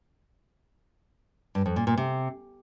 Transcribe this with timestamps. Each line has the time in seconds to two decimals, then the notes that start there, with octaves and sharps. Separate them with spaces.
1.55 G2
1.66 F2
1.76 A#2
1.87 A#2
1.97 C3